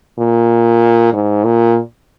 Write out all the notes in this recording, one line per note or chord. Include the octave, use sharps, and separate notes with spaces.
A#2
G#2
A#2